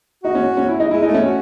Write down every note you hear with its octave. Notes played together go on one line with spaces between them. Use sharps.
D#4 F#4
C#4
C#4
E4
D#4
G#3 E4
D#4
A3
C#4
F#4